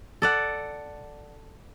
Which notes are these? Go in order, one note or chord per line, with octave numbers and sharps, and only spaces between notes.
A4 D5 F#5